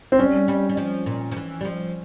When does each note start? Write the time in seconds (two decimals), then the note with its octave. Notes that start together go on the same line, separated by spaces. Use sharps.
0.12 C4
0.19 G3 C#4
0.48 G3
0.69 G3
0.77 F3
1.06 A#2
1.32 F3
1.36 E3
1.61 G3
1.65 F3